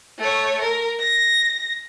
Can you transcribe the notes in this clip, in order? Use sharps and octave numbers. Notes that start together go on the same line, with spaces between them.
A3 C#5
A#4
A#6